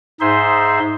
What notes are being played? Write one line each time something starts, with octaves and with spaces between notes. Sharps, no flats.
G#2 D#4 G#4 C5 E5 C6